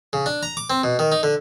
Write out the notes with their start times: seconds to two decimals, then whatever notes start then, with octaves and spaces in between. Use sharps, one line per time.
0.13 C#3
0.26 D4
0.43 A#5
0.57 D6
0.70 C4
0.84 B2
0.99 D#3
1.12 D#4
1.23 D3